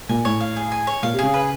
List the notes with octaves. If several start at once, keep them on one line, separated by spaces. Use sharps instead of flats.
A#2 G#5
A2 C#5
F5
G#4
G#5
C#5
A#2 F5
C3
C#3 G#4
B4